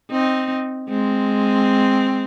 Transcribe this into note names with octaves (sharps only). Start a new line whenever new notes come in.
C4 D#4
G#3 C4